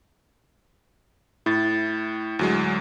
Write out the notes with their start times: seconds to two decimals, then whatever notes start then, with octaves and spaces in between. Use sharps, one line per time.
1.46 A2 E4 A6
2.39 D2 F#3 G#3